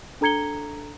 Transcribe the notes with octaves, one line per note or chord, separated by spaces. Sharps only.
D4 A4 A#5 G#6 C#7 G7